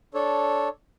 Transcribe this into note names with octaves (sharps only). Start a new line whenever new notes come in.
D4 A4 C#5